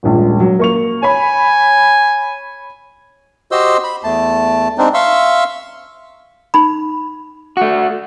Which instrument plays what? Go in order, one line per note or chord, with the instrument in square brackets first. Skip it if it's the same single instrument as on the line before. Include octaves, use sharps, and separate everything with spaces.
[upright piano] D#1 A#1 G#3
F#3
A#3 C#6 F7
[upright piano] C#5 B5 [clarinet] G#5
[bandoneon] F#4 G4 C5 D#5 C6 E6
B5
E2 A3 A5
G#3 C4 D4 D#4
E5 F5 C6 C#6 E6
[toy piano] D#4 B5
[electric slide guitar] A3 F#4